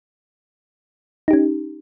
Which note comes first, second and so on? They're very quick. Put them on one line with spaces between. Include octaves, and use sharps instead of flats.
D#4 G4 C#4